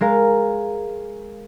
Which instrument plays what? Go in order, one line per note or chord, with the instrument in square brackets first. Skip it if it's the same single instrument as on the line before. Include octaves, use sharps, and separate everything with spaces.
[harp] G#3 A#4 F5